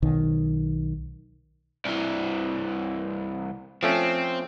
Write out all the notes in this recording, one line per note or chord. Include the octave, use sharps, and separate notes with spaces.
B1 D#3
C2 E3
F3 A3 C4 C#4